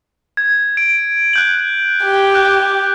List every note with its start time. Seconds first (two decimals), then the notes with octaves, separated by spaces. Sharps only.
0.37 G#6
0.77 D7
1.33 F#6 G6 F#7
2.04 G4
2.34 F#6 G6